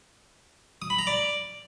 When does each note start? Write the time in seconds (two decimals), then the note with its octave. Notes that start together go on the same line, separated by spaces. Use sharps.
0.82 D#6
0.90 B5
0.99 A#5
1.07 D5